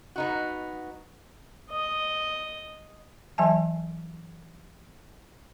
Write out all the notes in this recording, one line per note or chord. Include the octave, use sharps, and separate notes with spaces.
B3 D#4 F#4
D#5
E3 F#3 E5 G#5 A5